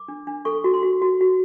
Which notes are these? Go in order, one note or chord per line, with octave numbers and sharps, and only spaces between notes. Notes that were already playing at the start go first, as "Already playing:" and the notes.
Already playing: D6
D4
D4
A4 C#6
F#4
C6
F#4
F#4
F#4